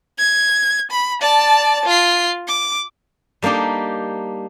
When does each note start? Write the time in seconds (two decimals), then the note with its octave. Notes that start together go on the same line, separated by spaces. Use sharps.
0.18 G#6
0.91 B5
1.21 D5 A5
1.86 F4 C7
2.47 D6
3.42 G3 A#3 D4 D#4 G4